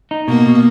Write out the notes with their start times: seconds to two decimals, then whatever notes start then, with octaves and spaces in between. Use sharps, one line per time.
0.11 D#4
0.28 B2 A#3
0.46 B2